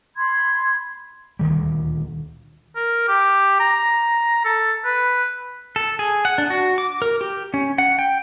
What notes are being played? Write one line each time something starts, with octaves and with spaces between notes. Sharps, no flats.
B5 C6 G#6
D#1 D2 D#3 G3
A#4
G4
A#5
A4
B4
A4
G#4
F#5
D4
F#4
D6
A#4
G4
C#4
F#5
G5